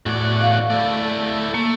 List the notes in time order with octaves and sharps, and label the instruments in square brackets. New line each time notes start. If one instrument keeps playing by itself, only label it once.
[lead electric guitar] E2 D5 [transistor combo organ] A2 F#4
[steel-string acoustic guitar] F5
[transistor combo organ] A3 [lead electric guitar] E4 D5
[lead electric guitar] A3 [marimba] A#3